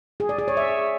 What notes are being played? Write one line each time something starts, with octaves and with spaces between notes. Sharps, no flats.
G#4
D5
G#4
C#5
E5